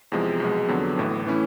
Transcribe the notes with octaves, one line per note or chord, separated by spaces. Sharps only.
E2 C3 F3 G#3
B1 B2 G#3
F2 D3 F#3 B3
A1 A2 E3
E3 A3 C#4 E4